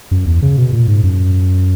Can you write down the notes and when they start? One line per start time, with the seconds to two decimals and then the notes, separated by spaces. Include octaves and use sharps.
0.11 F#2
0.26 E2
0.42 C#3
0.57 B2
0.73 A#2
0.88 G#2
1.03 F#2